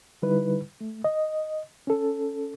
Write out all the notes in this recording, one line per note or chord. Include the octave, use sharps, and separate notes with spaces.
D3 G3 D#4 E4 B4
A3
D#5
C#4 A4